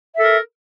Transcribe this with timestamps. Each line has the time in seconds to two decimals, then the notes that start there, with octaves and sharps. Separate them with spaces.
0.15 E5
0.18 A4
0.22 A#4